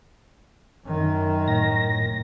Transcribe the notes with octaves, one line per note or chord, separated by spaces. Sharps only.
F#2 D#3
A2 A#6